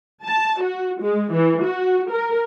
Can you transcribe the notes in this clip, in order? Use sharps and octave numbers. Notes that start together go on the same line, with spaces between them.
A5
F#4
G#3
E3
F#4
A#4